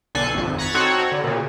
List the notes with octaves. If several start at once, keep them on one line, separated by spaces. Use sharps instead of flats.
B1 D3 A4 G#5 F#6 C7
G#1 F2
A#5 C#6 F#6 G#6 A6 B6
C4 D#4 F#4 A4 C#5
D3
A#2 C#3